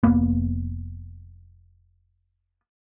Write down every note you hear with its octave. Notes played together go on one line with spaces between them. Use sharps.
F1 A#3 B3